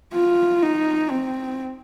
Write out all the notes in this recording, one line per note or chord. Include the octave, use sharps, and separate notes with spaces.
F4
D#4
C4